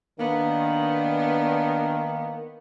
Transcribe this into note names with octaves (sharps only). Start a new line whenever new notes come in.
D#3 A#3 B3 D4